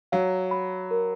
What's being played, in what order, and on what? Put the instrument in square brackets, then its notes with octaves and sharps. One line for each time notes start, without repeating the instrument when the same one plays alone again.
[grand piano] F#3 [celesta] F5
[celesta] B5
A#4